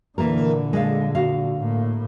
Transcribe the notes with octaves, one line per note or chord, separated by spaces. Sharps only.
A#2 D3 E3 A#3 A#4
G#3 A4 F5
F#4 F5
A2 A#3